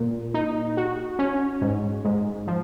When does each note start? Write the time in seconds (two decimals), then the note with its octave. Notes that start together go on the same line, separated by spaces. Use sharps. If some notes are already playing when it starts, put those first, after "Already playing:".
Already playing: A#2
0.34 D#4
0.77 F#4
1.19 C#4
1.61 G#2
2.04 G#2
2.47 F3